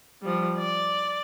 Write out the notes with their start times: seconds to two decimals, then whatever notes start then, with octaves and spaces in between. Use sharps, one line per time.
0.22 F3 G3
0.58 D5